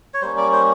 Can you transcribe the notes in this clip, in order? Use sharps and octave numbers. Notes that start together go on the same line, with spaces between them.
C#5
G3 A#3 C#4 C5
D5
C5